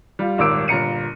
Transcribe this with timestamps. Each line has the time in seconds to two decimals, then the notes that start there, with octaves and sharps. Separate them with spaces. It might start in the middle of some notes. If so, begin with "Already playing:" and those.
0.19 G3 F4
0.38 D#1 G#1 A#4 D6 E6 D7
0.68 G1 A#2 A#5 C#7 D#7